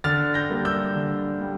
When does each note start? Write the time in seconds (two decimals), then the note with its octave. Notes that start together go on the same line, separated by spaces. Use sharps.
0.04 D3 F6 A6
0.34 G6 A#6
0.50 G3 A#3
0.65 E6 G6
0.95 D3
1.41 G3